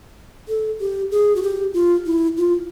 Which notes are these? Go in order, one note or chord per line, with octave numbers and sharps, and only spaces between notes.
A4
G4
G#4
F#4
G4
F4
E4
F4